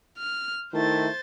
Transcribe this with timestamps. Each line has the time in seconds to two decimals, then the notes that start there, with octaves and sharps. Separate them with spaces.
0.18 F6
0.74 D#3 A3 E4 C5 A6